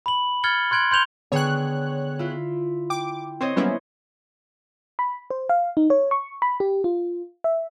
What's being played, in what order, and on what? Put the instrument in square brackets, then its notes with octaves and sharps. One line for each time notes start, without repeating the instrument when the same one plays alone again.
[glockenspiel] B5 F#7
F6 G#6 A6 C#7 G7
C6 F#6 G#6 D7 F#7
C6 G6 F7 G7
[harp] D3 [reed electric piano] B3 G#4 G5 [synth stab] C#5 F#6
[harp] E4 F4
[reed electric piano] G5 [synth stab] D6
[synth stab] C4 [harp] C5 C#5 D#5
[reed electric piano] F#3 G3 A#3 [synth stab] B3 C#4 E4
[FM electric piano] B5
C5
F5
D#4
C#5
C#6
B5
G4
F4
E5